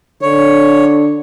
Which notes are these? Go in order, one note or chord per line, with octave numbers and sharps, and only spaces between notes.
D3 C#5